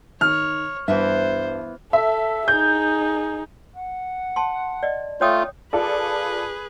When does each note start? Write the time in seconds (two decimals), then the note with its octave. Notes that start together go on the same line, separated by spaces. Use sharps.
0.21 D#3 C#5 F6
0.88 G2 E3 B3 C5 E5
1.93 A4 E5
2.48 D#4 G#4 G6
3.76 F#5
4.36 A5 C6
4.83 D5 D#5
5.21 A3 F4 C#5 G5 D#6
5.73 F4 G#4 A4 B4 D5